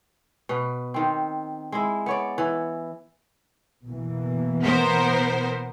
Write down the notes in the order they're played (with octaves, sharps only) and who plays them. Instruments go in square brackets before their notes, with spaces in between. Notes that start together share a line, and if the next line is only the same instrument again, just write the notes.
[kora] B2 B4
D#3 C4
G#3 E4
B3 C#5 D5
E3
[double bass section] B2 E3 A#3
[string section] B3 A#4 C5